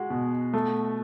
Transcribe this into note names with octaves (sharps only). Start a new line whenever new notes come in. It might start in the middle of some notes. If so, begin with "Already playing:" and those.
Already playing: G#3 F#4
B2
A3